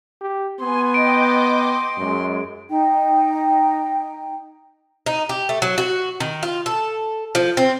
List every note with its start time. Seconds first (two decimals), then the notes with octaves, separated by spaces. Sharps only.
0.21 G4
0.61 B3 G#5 C6
0.94 D#5 G5 D6 D7
1.98 F#2 G#3
2.69 D#4 G5
5.06 D#4
5.29 G4
5.49 A3
5.62 F#3
5.78 F#4
6.20 D#3
6.43 F4
6.66 A4
7.35 F3
7.57 C4